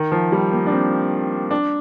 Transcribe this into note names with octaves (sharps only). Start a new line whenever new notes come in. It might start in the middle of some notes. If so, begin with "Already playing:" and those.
Already playing: D#3
F3
G3
A#3
D4
C4
D4